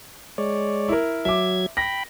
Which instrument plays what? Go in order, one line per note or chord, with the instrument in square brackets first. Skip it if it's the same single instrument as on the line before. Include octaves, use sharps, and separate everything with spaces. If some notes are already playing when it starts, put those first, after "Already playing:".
[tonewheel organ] G#3 C#5 D5
[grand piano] E4 A#4
[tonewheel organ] F#3 G#6 [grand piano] E5 D6
[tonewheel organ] G5 B5 [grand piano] A#6